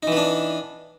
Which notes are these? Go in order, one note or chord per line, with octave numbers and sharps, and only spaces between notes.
E3 B3 D4 D#4